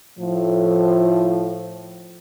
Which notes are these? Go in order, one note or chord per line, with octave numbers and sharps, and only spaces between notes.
A2 F3